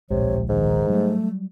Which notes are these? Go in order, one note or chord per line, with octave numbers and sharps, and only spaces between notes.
D1 A#1 C3 G#3 C#5
G#2 D#3
F#3 G3 A3